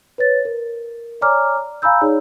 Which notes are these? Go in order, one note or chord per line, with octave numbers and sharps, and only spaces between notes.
B4 C#5 A6
A#4
C#5 D5 G#5 A#5 D6 F6
D5
F5 G#5 A#5 B5 E6 G6
D#4 G#4 C#5 D5